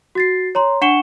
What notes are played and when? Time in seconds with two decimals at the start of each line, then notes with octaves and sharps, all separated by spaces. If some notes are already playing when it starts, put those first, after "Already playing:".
0.15 F#4 A6 C7
0.55 C#5 A#5 C6
0.81 D4 F#5 C#6 C#7 E7 G7